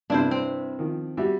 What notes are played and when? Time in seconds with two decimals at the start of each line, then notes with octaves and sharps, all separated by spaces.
0.10 G2 C3 D4 E4 C5
0.31 C4
0.79 D#3 F3
1.17 G3 F#4 E5